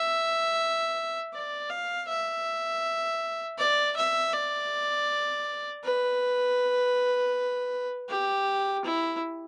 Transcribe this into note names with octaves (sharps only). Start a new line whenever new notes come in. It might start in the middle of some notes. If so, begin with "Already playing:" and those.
Already playing: E5
D5
F5
E5
D5
E5
D5
B4
G4
E4